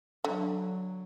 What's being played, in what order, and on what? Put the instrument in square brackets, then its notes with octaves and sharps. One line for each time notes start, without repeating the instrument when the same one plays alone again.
[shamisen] D3 [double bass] F#3